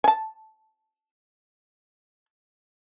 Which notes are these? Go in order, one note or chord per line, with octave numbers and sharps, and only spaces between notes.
G#5 A5